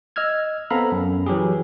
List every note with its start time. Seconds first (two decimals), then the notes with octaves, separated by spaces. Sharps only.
0.16 D#5 E6 F6 G#6
0.70 B3 C4 A4 F5 A#5 B5
0.92 F#2
1.26 E3 F#3 G4 G#4